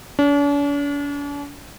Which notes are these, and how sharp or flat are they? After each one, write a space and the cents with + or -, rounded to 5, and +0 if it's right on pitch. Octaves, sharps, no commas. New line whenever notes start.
D4 -45